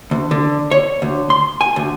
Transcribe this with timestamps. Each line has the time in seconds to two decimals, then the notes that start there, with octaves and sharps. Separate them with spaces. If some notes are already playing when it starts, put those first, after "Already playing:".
0.11 D2
0.31 D3
0.71 C#5
1.02 D2
1.30 C6
1.61 G#5
1.76 D2